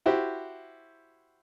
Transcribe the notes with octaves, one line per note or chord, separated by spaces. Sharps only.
E4 F#4 G4 C5